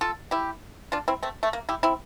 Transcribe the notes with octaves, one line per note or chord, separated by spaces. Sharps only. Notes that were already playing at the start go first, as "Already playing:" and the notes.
F4 A4
E4 G4
D4 F4
C4 E4
A3 C4
A3
A#3
E4 G4
C4 E4